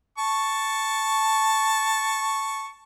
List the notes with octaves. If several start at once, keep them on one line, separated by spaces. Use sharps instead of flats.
A5 C#6